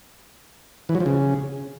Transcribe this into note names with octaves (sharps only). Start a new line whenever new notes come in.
E3
F#3
F3
C#3